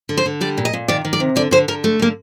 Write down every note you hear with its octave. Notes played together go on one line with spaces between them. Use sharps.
D3
C5
D3
G3 D5
A#2
D#5
A#2
D#3 D5
D#3
D5
C3
D3 D5
D3 C5
D3 A#4
A3
D3 A#3